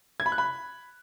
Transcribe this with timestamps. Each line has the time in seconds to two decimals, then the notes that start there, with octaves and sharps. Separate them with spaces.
0.20 G#6
0.26 B5
0.32 F#6
0.38 B5